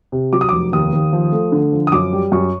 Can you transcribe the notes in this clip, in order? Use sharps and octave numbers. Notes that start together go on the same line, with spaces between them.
C3
F#3 D6
D#6
F1 D6
D#2 D#6
D#2
F3
A3
D3
F3
D#6
F#2 D6
G3
F#2 C#6